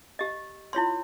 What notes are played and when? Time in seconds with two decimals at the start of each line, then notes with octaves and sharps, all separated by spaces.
0.19 G4 D#5
0.73 E4 F4 C#5 C6